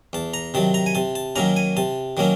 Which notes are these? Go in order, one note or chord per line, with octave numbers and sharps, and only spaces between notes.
E2 A5
A#5
C3 D#3 F#3 A5
A#5
G#5
C3 A5
A5
D#3 F#3 A#3 C#4 A#5
G#5
C3 A5
D#3 F#3 A#3 C#4